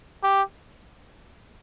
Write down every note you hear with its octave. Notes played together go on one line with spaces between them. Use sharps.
G4